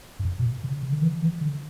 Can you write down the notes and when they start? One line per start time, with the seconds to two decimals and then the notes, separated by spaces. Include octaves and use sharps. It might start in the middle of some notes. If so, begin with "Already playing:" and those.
0.19 G2
0.25 F#2
0.39 B2
0.44 A#2
0.64 C#3
0.83 C#3
0.92 D3
1.02 E3
1.22 E3
1.41 D3